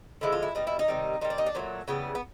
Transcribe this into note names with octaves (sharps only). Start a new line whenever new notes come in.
D3 F3 G#3 E4
F4
E4
B2 G3 D#4
E4
D#4
C3 D#3 G3
A#2 G3 D#4
D4
D#4
D4
A#2 F#3 A3 C#4
C#3 E3 G3 B3
B3